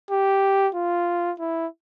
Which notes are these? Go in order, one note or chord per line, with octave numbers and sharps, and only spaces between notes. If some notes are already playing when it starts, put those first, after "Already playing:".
G4
F4
E4